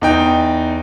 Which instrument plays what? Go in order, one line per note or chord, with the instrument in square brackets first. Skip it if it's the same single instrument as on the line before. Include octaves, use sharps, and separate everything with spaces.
[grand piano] E2 D#4 G5